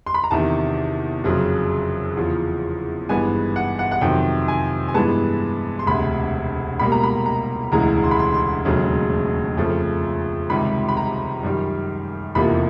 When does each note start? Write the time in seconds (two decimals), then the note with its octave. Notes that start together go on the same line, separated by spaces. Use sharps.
0.06 C6
0.14 B5
0.24 A#5
0.31 E2 C3 D#3 A5
1.23 F#1 F2 C#3 F#3
2.17 E2 C#3 F3
3.09 G#1 G2 E3 G#3 B3 G#5
3.56 F#5
3.79 F#5
3.91 F#5
4.01 F2 C3 D#3 F#3 G5
4.48 G#5
4.88 G#5
4.94 G2 E3 G#3 B3 A5
5.79 C6
5.86 E1 D2 C3 B5
6.80 C#2 B2 G3 A#3 B5
6.92 A#5
7.03 B5
7.26 A#5
7.72 E1 D2 C#3 E3 G#3 A#5
8.04 C6
8.11 B5
8.19 C6
8.34 C6
8.65 E1 D#2 C#3 F#3 A3
9.57 F2 C#3 F3 A3
10.50 C#2 C3 D#3 G3 B5
10.89 B5
10.97 A#5
11.43 F#2 D#3 G3
12.35 F1 E2 C3 F3 A#3 B5